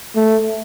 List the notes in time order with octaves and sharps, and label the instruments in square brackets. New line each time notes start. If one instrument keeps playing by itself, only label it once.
[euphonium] A3